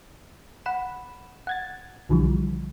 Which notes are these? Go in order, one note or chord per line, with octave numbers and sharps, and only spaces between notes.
F#5 B5 E7
F#5 G#6 A6
B1 D3 E3 F3 G3